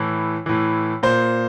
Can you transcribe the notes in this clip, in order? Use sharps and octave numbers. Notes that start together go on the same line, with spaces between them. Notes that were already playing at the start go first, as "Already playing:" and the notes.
Already playing: A2 E3
A2 E3
A#2 C5